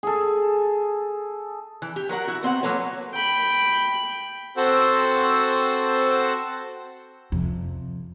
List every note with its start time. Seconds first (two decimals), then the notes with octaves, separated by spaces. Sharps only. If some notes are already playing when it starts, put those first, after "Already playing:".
0.03 G#4 A4
1.82 E3
1.96 G4
2.09 F#3 A#4 C5 F#5
2.27 E4 F#4
2.43 B3 C4 E5 F#5
2.63 F#3 A#3 A4 B4 C#5
3.14 G5 B5
4.57 C4 F#4 A4 C5 F#5 E6
7.32 F2 C3